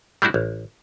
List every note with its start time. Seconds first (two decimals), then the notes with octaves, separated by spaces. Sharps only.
0.22 G3 A3 D4 E4 F#4
0.34 A1